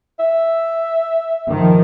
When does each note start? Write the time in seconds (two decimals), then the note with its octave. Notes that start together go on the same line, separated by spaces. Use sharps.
0.20 E5
1.50 D#3 F3